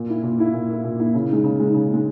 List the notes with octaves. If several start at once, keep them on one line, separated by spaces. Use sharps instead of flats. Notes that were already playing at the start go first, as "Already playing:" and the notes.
Already playing: A#2
A#3 E4
A#2
A#3 E4
A#2
A#3 E4
A#2
A#3 E4
C#3
G#3 D#4
C#3
G#3 D#4
C#3
G#3 D#4